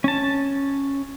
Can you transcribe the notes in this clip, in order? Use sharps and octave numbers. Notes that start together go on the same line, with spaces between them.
C#4 A5